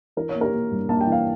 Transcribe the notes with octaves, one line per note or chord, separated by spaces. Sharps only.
E3 A#4
C#5
A#3
G4 A#4
A#3
G2
A#3 A5
G5
E3 F5